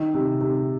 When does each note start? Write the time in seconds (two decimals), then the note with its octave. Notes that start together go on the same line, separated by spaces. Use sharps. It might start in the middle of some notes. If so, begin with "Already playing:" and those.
Already playing: D#3
0.14 C3
0.41 C3